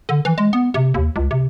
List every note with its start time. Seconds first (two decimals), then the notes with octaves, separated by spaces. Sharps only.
0.09 D3
0.25 E3
0.38 G#3
0.53 B3
0.74 C3
0.94 D#2
1.16 C#2
1.31 C3